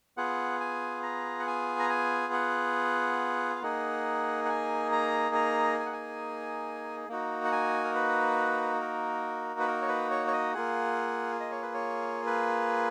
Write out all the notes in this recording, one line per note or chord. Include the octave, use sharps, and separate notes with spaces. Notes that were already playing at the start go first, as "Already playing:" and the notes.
B3 F4 G#4 F#5
G#5
A#5
F#5
G#5
A#5
G#5
F#5
F5
A#3 D#4 G#4 F#5
F#5
G#5
A#5
A#5
G#5
F#5
G#5
A#3 D#4 F#4
F#5
G#5
A#4
B4
A#4
B4
A#4
C#5
B4
C#5
C#5
D#5
A#3 F4 G#4 F#5
D#5
C#5
B4
C#5
B4